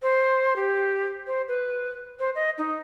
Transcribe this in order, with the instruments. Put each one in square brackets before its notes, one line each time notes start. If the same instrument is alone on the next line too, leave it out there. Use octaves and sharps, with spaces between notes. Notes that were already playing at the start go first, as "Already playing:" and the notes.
[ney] C5
G4
C5
B4
C5
D#5
D#4